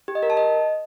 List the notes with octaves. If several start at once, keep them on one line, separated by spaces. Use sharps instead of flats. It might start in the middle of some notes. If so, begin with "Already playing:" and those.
G4
D#5
A#4
A5
D#5